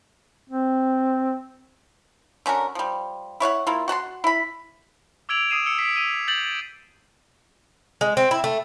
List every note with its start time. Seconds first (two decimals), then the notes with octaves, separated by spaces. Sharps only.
0.50 C4
2.46 D3 C#4 F#4 A#4
2.75 F3 G3
3.40 E4 C#5 F5 F#5
3.67 A#3 E4 F4
3.88 F#4 F#5 A5 C6
4.24 E4 B5
5.29 D6 E6 G#6 D7 F7 F#7
5.50 D6 D#6 C7 D#7 E7
5.66 E6 C#7
5.78 B6 C7 D7 F7
5.96 E6 D#7 F7
6.28 G6 A6 F7 F#7
8.01 G#3
8.17 C4
8.31 E4
8.44 A3